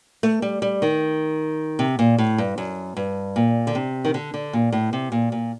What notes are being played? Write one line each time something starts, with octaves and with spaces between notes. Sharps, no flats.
A3
G3
G3
D#3
C3
A#2
A2
G2
F#2
G2
A#2
D3
C3
D#3
D3
D3
A#2
A2
C3
A#2
A#2